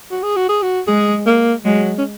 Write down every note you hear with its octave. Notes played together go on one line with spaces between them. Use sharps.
F#4
G#4
F#4
G#4
F#4
G#3 G#4
A#3
F#3 G#3
C#4